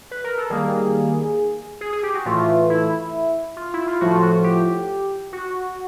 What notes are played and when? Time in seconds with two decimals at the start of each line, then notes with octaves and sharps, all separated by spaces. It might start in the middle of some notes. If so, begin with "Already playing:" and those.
0.11 B4
0.24 A#4
0.38 A4
0.50 D#3 G3 A#3 G#4
1.81 G#4
1.93 G#4
2.03 G4
2.15 F#4
2.26 A2 E3 A3 F4
2.70 E4
3.57 F4
3.74 E4
3.87 F4
4.01 A2 F3 A3 F#4
4.14 F4
4.23 F#4
4.44 G4
5.33 F#4